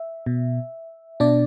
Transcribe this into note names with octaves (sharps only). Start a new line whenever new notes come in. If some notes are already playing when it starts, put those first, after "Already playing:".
Already playing: E5
B2
B2 D4 D5